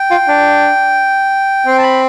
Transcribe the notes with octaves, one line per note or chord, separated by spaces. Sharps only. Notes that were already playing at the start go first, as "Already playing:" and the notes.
Already playing: G5
F4
D4
C4
A5
B5